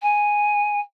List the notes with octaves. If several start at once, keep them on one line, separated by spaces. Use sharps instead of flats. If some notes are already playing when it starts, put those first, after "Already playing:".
G#5